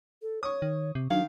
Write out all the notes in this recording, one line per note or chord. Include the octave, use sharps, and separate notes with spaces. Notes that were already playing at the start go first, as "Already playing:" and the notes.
A4
C#5 C#6 D#6
D#3
C3
D#3 F#3 D4 F5